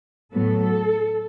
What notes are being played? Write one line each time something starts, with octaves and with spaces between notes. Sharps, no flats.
A2 F#3 B3 A4